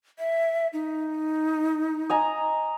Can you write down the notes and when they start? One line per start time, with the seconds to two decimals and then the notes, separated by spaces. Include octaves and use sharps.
0.19 E5
0.73 D#4
2.10 D#5 G#5 A#5